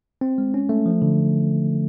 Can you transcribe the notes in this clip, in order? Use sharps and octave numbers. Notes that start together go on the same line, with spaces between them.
C4
G#3
C#4
A3
F3
D3